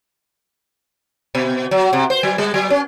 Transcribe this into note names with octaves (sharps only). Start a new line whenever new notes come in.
B2
F#3
C3
C5
F#3
G3
F#3
C#4